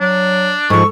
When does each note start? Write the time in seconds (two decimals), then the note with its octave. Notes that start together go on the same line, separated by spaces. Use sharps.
0.01 F#3 D4
0.70 G#2 F3 A4 C#6